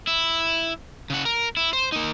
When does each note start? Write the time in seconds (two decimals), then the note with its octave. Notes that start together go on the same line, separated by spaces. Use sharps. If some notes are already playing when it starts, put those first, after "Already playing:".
0.07 E4
1.10 C#3 F#5
1.25 A#4
1.57 E4
1.73 C5
1.92 A#3 D#4